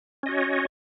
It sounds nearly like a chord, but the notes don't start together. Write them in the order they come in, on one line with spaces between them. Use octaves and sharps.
C#4 D#5 F#4 C#5